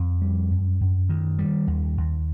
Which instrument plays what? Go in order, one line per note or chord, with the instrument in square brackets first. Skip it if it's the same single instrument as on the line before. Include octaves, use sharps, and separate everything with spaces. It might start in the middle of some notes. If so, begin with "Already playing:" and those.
Already playing: [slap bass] F2 F3
G3
F#2
F#2
D#3
G3
D#2
D#2